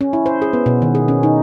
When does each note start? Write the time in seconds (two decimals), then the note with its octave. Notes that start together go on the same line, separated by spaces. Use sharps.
0.01 C#4
0.13 E4
0.26 C5
0.42 G#4
0.53 B3
0.66 B2
0.82 D#3
0.95 G#4
1.08 C#4
1.23 D#4